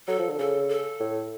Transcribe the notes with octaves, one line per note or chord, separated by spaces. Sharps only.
F#3 A4
F3
D3
C#3 A4
A4
A2